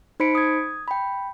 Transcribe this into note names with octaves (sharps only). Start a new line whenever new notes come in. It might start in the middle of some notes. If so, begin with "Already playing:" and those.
D#4 C5 B5 B6 C#7 D7
D#6 G#6
G5 B5